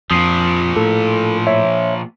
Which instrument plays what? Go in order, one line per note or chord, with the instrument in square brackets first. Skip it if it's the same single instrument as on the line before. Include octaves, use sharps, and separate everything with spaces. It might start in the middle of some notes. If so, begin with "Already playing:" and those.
[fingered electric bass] F2 [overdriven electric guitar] A#2 F3 [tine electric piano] D#6 C7
[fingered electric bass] A2 [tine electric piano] A4
[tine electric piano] C#5 E5